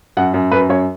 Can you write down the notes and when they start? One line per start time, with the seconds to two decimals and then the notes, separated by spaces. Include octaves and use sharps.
0.17 F#2 F#5
0.34 F#2
0.51 F#2 B4
0.69 F#2 C#5